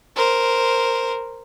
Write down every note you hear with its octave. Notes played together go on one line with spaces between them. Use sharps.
A#4 C5